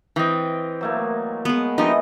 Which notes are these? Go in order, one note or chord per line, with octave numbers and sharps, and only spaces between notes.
E3 C4 D#5 G5
F#3 A3 A#3
G#3 B3
B2 E3 F3 D#4 G4 D#5